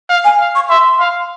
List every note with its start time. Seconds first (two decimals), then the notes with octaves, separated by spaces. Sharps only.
0.09 F5
0.24 G#5
0.40 F5
0.55 C#6
0.69 E5 C6
1.00 F5